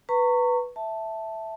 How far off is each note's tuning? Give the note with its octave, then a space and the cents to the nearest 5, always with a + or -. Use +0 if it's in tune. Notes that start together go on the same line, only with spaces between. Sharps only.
B4 +0 A#5 -35 C#6 +0
E5 -5 A5 +0